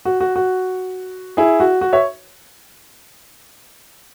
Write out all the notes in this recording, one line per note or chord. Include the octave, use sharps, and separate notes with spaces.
F#4
F#4
F#4
E4 G#4
F#4
F#4
C#5 E5